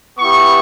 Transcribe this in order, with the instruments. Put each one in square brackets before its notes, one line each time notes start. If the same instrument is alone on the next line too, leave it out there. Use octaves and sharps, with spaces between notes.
[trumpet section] B3 E4 G4 C#6